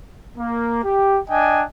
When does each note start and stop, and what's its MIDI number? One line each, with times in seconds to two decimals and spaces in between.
0.38 0.84 58
0.84 1.19 67
1.29 1.63 62
1.29 1.63 75
1.29 1.63 79
1.29 1.63 80